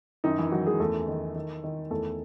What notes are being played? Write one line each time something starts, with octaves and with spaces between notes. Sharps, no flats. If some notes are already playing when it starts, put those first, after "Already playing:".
F#2 D#3 D#4
E3 E4
D#3 F#3 F#4
G#3 G#4
E2 A3 A4
D#3
D#3
D#3
E2 A3 A4